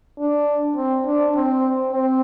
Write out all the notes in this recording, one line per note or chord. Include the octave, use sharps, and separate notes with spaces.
D4
C4
D4
C4
C4